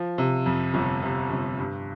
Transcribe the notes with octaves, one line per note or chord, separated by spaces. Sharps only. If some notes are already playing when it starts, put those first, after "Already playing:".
Already playing: F3
C3
F2
G1
C3
G1
G2